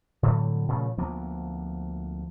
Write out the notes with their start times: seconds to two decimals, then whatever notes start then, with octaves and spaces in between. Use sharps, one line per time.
0.23 A2 D3 F#3 G3
0.68 A#2 C#3 F3 A3
0.97 D2 F3 A#3 B3